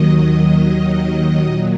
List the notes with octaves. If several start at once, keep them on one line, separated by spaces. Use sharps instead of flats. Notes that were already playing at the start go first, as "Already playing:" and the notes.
Already playing: D#2 D#3 F#3 D#5
D#2 D#3 F#3
A#2 F#3